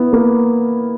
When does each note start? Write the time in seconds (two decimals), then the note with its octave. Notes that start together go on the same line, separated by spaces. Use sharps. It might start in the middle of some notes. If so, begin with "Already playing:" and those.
Already playing: B3 E4
0.13 A#3